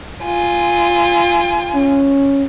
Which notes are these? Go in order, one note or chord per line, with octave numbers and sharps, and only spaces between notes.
F4 G#5
C#4